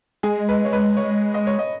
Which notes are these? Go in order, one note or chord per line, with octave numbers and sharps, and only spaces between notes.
G#3 G#4
B4
C#5
B4
C#5
D#5
C#5
D#5